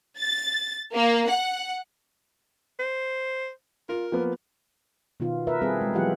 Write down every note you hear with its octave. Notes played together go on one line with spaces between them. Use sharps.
A6
A#3
F#5
C5
F4 A#4
F3 A#3 B3
B2 D#3 B3 F4
A#4 B4 E5
G3 C4 G#4 A4 B4
G#3
E3 F#3 B3 F4 G4 F#5